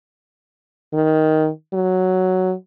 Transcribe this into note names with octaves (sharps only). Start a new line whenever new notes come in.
D#3
F#3